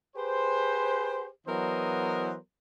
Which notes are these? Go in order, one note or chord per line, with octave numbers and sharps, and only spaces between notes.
G4 G#4 B4 C5
E3 F#3 B3 A#4 C5 D#5